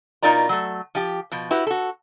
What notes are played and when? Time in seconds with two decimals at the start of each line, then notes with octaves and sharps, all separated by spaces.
0.22 B2 D#4 F4 A#4 D5 A#5
0.49 F#3 A3
0.95 F3 G4
1.32 B2 F3
1.51 E4 F#4 G4 B4
1.67 F#4 A4